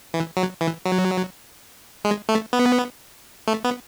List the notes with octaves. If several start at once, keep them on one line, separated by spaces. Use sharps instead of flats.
E3
F#3
E3
F#3
G#3
A3
B3
A3
B3